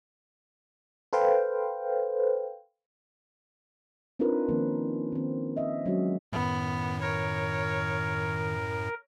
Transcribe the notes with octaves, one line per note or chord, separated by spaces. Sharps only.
A4 B4 C5 F5 G5
C4 D4 D#4 F4 A#4 B4
D#3 F3 A#3 C4 C#4
D#3 C4
D#5 E5
F#3 G#3 C#4 F#4
F#2 A2 D#3 B3
A#4 C#5